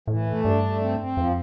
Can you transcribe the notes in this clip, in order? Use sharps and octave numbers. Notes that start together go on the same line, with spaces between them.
A2 E3
A3
G2 D4
A3
C4
C4
F2 F3